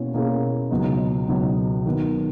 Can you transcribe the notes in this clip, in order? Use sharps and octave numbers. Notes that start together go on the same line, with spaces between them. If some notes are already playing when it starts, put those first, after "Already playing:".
Already playing: B2 A#3 C#4 E4
B2 A#3 C#4 E4 G#4
C#2 B2 F#3 B3 D#4
C#2 B2 F#3 B3 D#4
D#3 F#3 B3